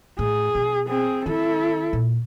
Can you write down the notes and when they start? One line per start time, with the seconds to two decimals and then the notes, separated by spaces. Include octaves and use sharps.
0.19 A2 G#4
0.55 B2
0.88 C4 G#4
1.26 D#3 C4 E4 A4
1.93 A#2